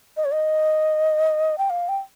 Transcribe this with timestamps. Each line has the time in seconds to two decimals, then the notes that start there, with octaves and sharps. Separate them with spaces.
0.17 D#5
0.25 C#5
0.32 D#5
1.58 G5
1.70 F5
1.89 G5